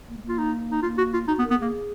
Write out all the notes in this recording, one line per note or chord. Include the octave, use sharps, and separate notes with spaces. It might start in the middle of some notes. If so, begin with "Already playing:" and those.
A#3
G#3
A#3
F4
D#4
D#4
A#3 F4
F#4
F4
D#4 F#4
B3
A#4
B3
A#3 G#4